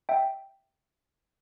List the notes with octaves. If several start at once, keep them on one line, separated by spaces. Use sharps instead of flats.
E5 G5